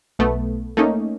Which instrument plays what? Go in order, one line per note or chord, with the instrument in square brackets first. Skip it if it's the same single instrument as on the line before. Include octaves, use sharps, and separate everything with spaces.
[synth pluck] B1 A3 B3
A3 A#3 C#4 D#4